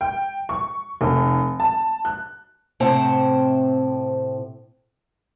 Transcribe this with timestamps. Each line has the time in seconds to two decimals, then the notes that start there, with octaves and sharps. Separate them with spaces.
0.01 G5
0.49 C#6
1.01 F1
1.60 A5
2.05 F#6
2.80 A2 C3 C4 C5 F#5 A5